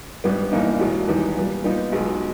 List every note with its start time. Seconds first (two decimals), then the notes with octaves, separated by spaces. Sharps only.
0.24 G#1 G2 G3 B3
0.52 G1 G2 E3 A#3 D#4
0.80 E1 E2 B2
1.08 E2 D#3 G3 B3 G4
1.36 A#2 G3 B3
1.64 A#2 G3 B3 D#4 G4
1.92 B1 B2 G#3